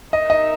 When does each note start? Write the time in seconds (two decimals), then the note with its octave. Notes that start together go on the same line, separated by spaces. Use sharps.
0.13 D#4 A#4 D#5 E5
0.30 D#5